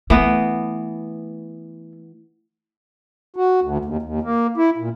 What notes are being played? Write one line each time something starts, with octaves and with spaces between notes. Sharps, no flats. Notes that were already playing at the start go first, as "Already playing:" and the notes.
E3 A3 B3
F#4
D2
D#2
D#2
A#3
E4
A#2